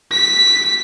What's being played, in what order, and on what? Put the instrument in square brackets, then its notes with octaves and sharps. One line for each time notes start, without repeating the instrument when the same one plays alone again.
[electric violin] B6